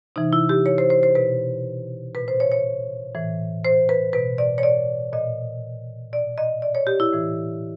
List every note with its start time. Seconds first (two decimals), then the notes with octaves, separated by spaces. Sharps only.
0.16 C3 E3 D#4
0.33 E4
0.49 G4
0.66 C#5
0.78 C5
0.90 C5
1.03 C5
1.15 B2 B4
2.15 A#2 B4
2.28 C5
2.40 C#5
2.52 C#5
3.15 A2 E3
3.65 C5
3.89 B4
4.13 B2 B4
4.38 D5
4.58 C#5
4.63 D5
5.13 A#2 D#5
6.13 B2 D5
6.38 D#5
6.62 D5
6.75 C#5
6.87 G4
7.00 E4
7.13 A2 E3